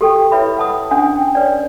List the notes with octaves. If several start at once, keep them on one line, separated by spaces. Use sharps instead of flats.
G4 A4 G5
E4 B4 C#5 E5 B5
B4 F#5 A5 D#6
C#4 D4 F#5 G#5
G5
B4 C#5 D5